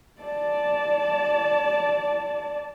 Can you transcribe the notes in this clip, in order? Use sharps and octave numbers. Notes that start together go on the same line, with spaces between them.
D5 A5